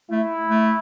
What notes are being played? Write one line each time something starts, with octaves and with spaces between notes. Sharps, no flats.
A3 E4
A3